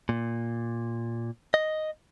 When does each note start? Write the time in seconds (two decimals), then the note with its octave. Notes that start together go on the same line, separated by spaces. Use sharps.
0.09 A#2
1.54 D#5